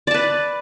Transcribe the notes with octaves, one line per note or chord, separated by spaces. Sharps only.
B4 D5 A5